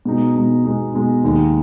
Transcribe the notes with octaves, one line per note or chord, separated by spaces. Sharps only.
B2 G#3 D#4
B2 G#3 D#4
B2 G#3 D#4
B2 G#3 D#4
D#2 D#3 G#3 D#4